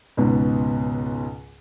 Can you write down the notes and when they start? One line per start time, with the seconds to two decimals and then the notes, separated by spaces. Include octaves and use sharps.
0.17 C#2 G#2 B2